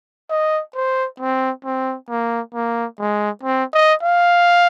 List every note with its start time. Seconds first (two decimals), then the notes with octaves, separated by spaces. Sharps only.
0.30 D#5
0.75 C5
1.20 C4
1.65 C4
2.09 A#3
2.55 A#3
2.99 G#3
3.43 C4
3.73 D#5
4.03 F5